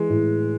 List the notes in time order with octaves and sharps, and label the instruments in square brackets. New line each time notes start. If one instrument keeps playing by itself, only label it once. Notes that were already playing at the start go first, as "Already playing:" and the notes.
Already playing: [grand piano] E3 [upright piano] G#3
[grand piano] A2